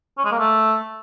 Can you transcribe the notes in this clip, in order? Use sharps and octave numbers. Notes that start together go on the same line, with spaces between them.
C#4
G#3
A#3
A3